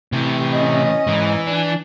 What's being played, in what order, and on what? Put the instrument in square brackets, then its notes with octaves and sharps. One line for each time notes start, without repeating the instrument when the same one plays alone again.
[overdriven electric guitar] A2 E3 [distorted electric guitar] C3
[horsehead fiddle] C#4 D#5
[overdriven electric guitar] G#2 [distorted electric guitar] E3
[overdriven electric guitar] D4